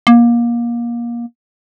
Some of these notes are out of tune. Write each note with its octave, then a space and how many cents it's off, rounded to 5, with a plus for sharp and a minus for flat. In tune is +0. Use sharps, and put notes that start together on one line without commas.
A#3 +25